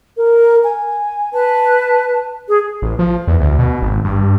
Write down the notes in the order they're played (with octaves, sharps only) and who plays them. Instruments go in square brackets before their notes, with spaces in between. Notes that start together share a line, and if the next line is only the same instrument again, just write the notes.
[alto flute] A#4
G#5
[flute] B4 [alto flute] A5
[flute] G#4
[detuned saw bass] A1
F3
E2
D2
B2
G#1
G2